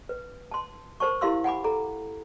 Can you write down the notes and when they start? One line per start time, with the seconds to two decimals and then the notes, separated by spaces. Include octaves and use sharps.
0.09 B4
0.51 A5 C6
1.00 A#4 C5 A5 C#6
1.21 E4 G4 A#4 F5 C6 E6
1.44 F#5 G#5 B5 D6
1.64 A4 A#5